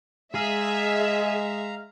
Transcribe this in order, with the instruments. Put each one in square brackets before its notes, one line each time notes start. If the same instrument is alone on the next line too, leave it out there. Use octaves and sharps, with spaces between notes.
[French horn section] G#3 [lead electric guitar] G#4 [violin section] E5 [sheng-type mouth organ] F5 A#5